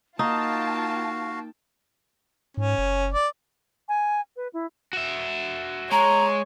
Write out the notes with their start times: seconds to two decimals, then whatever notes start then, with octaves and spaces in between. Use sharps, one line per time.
0.19 A#3 D#4 F4 F#4 F5 G5 A5
2.57 G#2 C#4
2.78 F#1
3.13 D5
3.89 G#5
4.36 B4
4.53 E4
4.93 F#4 E5
5.92 G#3 C#5 A#5